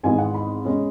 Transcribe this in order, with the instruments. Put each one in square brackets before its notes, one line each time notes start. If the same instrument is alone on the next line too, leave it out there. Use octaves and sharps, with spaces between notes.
[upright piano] G#1 G#2 E3 G#3 B3 G#5
F#5
B5
B2 G#3 C#4